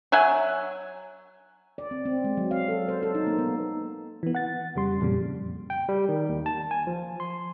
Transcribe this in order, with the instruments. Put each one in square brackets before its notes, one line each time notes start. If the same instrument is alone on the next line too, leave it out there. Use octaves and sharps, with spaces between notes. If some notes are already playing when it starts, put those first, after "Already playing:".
[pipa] F#3 E5 F#5 G#5
[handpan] D5
C4
C4
G#3
F#3
F5
A4
C5
A4
D#4
A#3
B3
[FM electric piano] E3 B3
F#5 A6
F2 C#3 G3 C6
F2 A#2 C#3 G3
[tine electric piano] G5
G3
D#3
D#2
A5
G#5
F3
C6